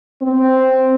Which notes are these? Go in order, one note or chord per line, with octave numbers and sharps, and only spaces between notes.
C4